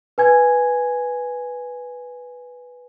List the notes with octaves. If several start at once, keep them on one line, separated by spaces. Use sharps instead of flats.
B4 G#5 G#6